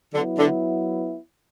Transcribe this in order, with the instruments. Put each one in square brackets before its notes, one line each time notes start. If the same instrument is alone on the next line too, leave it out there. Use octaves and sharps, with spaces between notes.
[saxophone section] D3 [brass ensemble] F#3 B3 E4
[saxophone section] D3